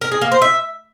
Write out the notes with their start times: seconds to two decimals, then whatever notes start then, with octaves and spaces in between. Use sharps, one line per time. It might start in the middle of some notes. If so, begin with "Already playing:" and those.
0.01 A#4
0.11 G#4
0.22 A#3
0.32 C5
0.42 E5